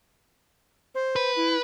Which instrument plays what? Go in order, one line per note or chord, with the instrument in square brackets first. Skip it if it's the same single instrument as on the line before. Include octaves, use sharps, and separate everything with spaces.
[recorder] C5
[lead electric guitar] B4
[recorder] E4